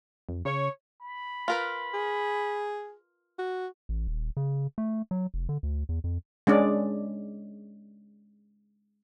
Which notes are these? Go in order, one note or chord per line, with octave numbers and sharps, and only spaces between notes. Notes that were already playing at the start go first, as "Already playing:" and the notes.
F2
C#3 C#5
B5
F4 A#4 B4
G#4
F#4
A1
D#1
C#3
A3
F#3
F1
D3
D2
E2
F2
G#3 C#4 D4 D5